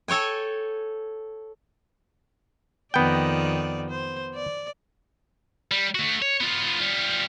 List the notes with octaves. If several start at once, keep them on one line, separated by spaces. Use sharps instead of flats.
A4 C#5 G5 G#5
F2 D#3 B3 D5 G5
C5
D5
G3
A3 F#4
C#5
B3 F4
G3 F4